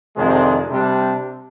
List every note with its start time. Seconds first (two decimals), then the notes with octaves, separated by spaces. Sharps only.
0.16 F2 C3 D#3 G#3 D4
0.70 C3 G3 D4